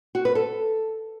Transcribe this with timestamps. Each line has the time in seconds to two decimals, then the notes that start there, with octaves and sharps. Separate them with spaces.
0.15 F#4
0.25 B4
0.35 A4